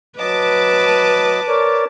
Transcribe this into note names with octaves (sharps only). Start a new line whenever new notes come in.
F#3 B4 D#5 A5 D6
A#4 C#5 D5